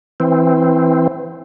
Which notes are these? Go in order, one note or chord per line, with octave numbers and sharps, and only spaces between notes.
E3 C4